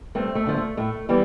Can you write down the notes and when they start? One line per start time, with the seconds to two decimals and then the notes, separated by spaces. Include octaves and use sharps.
0.15 G2 A3 C4
0.35 A3
0.46 D3 F3
0.57 A3
0.77 A2 A3
1.09 E3 G3 B3